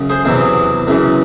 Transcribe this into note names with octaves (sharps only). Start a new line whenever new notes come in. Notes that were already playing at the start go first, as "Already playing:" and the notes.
Already playing: F#2 C#3
G#4 C5
E2 C3 F#3 E4 G#4
F#2 C#3 E3